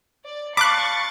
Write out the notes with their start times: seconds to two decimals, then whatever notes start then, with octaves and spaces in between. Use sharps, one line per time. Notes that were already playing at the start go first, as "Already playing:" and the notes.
0.24 D5
0.57 F5 A5 B5 C#6 D6 F#6 A6 C#7